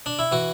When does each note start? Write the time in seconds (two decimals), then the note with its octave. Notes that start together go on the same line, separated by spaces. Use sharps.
0.06 D4
0.19 E4
0.32 E3 F#4